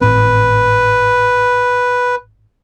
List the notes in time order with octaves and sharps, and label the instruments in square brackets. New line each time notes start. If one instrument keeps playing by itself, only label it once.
[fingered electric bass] G#1 A2 C4 [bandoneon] B4